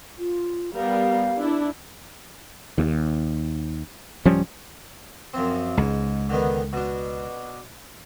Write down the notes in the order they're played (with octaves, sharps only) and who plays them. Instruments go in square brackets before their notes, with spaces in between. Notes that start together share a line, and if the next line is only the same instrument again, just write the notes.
[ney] F4
[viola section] G3 B3 A#4 [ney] F5
[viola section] D4 E4
[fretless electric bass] D#2
D1 F3 G3 C#4
[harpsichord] F#2 F3 C4
[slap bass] C#2 [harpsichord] G#2
[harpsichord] D3 D#3 B3
B2 D4